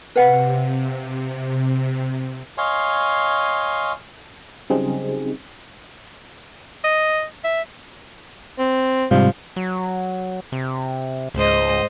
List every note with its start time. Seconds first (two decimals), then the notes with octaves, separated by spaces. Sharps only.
0.16 C3 B4 F5 F#5
2.58 C#5 D#5 F5 G#5 C6
4.70 C#3 F#3 G3 C4 D#4 G#4
6.84 D#5
7.44 E5
8.58 C4
9.11 G#2 C3 F3 G3
9.56 F#3
10.52 C3
11.35 C#2 G#2 C5 D#5